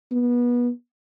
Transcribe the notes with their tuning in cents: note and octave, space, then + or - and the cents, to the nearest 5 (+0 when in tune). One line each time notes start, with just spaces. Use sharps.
B3 -25